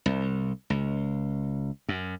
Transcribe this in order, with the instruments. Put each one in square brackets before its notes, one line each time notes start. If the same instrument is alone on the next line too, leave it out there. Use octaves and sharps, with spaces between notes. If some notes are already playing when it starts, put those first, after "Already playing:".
[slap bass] C2
C#2
F#2